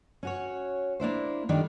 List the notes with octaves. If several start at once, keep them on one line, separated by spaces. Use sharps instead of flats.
C#4 F#4 C#5
A#3 D4 E4 C5
D#3 G3 D4 G4 A4